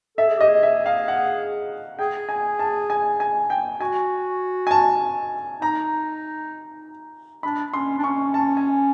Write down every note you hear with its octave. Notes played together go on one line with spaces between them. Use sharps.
A4 E5
G#4
G4 D#5
G#4
E5
F5
F#5
G#4 G5
G#5
A5
G#5
G#5
G5
F#4 G#5
G#5
A5
D#4 A#5
D4 B5
C#4 C6
D4
C#4 C#6
A5
G#5